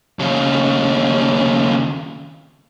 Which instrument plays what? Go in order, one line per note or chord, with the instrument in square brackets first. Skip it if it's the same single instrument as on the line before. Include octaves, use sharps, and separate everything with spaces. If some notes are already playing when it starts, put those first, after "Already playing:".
[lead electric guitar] D#2 C#3